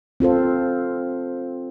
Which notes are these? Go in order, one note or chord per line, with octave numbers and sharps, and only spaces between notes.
C4 F4 A4 C5